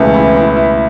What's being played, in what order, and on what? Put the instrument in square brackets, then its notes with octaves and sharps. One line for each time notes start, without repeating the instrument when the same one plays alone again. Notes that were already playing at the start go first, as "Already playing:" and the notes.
Already playing: [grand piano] C#2 B2 A3 [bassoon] E3
[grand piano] E4
E4
E4